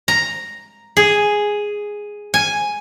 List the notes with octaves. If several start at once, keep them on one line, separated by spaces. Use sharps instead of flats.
A#5
G#4
G#5